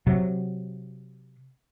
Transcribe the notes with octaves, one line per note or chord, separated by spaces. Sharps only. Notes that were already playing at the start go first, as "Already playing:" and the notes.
C3 F#3